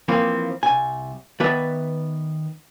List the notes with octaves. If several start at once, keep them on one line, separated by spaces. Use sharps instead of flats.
E3 F3 A#3 C4
C2 G#5
D#3 B3 B4 D5 E5 A5